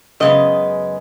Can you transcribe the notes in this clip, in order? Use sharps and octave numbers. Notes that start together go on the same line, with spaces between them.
F#2 C#3 G#3 B3 D#5